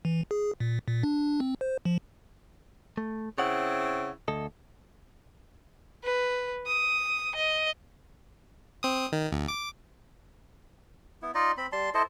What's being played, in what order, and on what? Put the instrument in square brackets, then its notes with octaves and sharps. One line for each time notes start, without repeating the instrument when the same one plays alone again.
[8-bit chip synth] E3
G#4
A#2
A#2
D4
C4
C5
F3
[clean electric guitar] A3
[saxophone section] C#3 C4 E4 [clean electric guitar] C#5 F#5
[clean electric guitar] D2 A4 D#5
[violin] B4
D#6
D#5
[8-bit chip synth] C4 D#6
D#3
D2
D6
[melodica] B3 E4
D#4 F4 D5 D#5
C4 B5
G3 A5 C6
E4 A4 C5 D#5